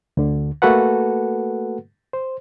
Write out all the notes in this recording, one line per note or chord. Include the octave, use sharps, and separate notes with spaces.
D2 D3
A3 A#3 F#4 A4 B4 F#5
C5